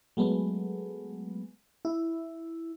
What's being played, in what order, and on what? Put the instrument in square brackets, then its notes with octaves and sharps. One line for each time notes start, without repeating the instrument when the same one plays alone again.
[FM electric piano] F#3 G#3 A3 B3
E4